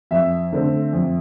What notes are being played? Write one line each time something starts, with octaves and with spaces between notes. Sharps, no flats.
F2 E5
D3 A3 C4
F2